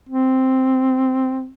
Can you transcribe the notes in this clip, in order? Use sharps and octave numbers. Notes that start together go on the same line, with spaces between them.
C4